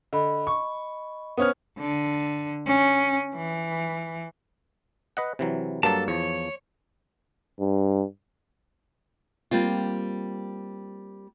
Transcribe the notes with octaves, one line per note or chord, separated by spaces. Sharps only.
D3 D#5 B5
C#6
B3 C#4 C5 F#5 D#6 F6
D3
C#4
E3
B4 D#5 F#5
C3 E3 F#3
G2 F#3 A#3 A4 A5
E2 F3 C#5
G2
G3 A#3 C4 F4